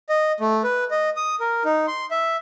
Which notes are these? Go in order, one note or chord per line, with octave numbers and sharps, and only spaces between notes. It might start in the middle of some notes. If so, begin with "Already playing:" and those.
D#5
A3
B4
D#5
D#6
A#4
D#4
C6
E5